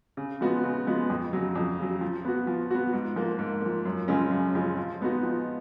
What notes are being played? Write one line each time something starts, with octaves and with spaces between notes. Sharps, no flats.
C#3
F3 G#3 B3 F#4
C#3
F3 G#3 B3 F#4
F2
C#3 F#3
F2
C#3 F#3
F3
B3 F#4
F3
B3 F#4
G#2
F3 A#3
G#2
F3 A#3
F#2
C#3 F3 G#3 C#4
F#2
C#3 F3 G#3 C#4
F3
G#3 B3 D#4 F#4
F3